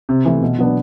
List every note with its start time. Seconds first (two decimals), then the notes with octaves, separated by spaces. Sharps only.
0.09 C3
0.25 E3 A3
0.42 B2
0.59 F#3 B3 D4